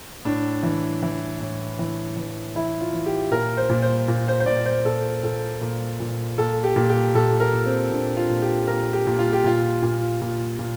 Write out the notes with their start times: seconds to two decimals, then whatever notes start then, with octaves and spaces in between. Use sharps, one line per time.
0.25 A2 D4
0.63 E3
1.03 E3
1.41 A2
1.79 E3
2.17 E3
2.55 E3 E4
2.81 F4
2.93 E3
3.06 G4
3.31 A#2 A#4
3.57 C5
3.70 A#2
3.82 C5
4.08 A#2
4.28 C5
4.40 C5
4.46 A#2 D5
4.66 C5
4.85 A#2 A4
5.23 A#2 A4
5.61 A#2
6.00 A#2
6.38 A#2 A4
6.63 G4
6.76 A#2
6.89 G4
7.14 A#2 A4
7.40 A#4
7.53 A#2
7.66 C4
7.91 A#2 D4
8.17 F4
8.30 A#2
8.42 G4
8.67 A#2 A#4
8.93 G4
9.07 A#2
9.19 F4
9.33 G4
9.44 A#2 F4
9.83 A#2
10.22 A#2
10.59 A#2